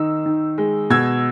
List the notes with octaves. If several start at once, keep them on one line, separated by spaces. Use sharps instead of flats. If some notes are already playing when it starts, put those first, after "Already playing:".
Already playing: D#3 D#4 E6
D#3
G#3
B2 E6 G#6